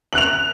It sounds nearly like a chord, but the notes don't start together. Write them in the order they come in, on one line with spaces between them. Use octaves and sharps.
F#7 F#6 F7